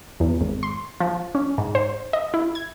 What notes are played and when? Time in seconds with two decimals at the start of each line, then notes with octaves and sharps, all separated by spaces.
0.20 E2
0.41 G#1
0.63 C6
1.00 F3
1.35 C#4
1.58 G#2
1.75 C5
2.13 D#5
2.34 E4
2.55 G#6